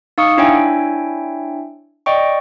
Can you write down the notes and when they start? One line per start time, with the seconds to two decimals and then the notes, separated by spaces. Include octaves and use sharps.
0.18 D#4 F5 C#6 D#6 C#7
0.38 D4 E4 C#5 E5 G5 G#5
2.06 D5 D#5 G5 C#6